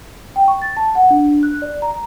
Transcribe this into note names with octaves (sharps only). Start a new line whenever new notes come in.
G5
C#6
A6
A5
F#5
D4
F#6
D5
A#5